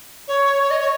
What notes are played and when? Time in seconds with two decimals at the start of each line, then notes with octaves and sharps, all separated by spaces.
0.27 C#5
0.62 C#5
0.70 D#5
0.79 C#5